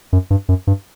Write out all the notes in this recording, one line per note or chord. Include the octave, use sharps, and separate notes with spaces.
F#2
G2
F#2
G2